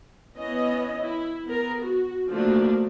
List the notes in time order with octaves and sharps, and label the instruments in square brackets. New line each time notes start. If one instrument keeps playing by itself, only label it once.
[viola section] E3 B3 C#4 D#5
E4
B3 A#4
F#4
D3 F3 A3 A#3 D4 F#4